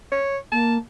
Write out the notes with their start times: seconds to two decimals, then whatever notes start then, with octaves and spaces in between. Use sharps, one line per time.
0.12 C#5
0.52 A#3 A5